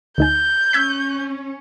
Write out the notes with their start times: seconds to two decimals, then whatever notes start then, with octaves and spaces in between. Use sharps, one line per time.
0.18 D2 D#4 G#5 G6
0.73 C#4 E6 G#6 B6